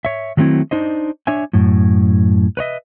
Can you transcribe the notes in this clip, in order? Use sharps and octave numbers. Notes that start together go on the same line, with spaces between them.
C#5 E5
D#3 F#3 A3 C4 E4
D4 D#4 C5 D#5
D4 C#5 E5 G#5
F#2 A2
B4 C#5 D#5 E5